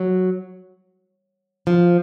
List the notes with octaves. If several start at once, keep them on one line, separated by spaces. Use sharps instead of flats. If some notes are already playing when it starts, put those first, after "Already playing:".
Already playing: F#3
F3